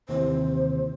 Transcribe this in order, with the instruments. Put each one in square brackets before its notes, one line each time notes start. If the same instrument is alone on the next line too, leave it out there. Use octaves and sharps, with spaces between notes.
[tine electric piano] D#2 C3 E3 [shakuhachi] C5